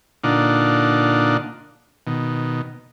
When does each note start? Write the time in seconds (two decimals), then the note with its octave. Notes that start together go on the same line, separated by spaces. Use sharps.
0.24 A#2 D3 D4 D#4 F4 F#5
2.07 B2 D#3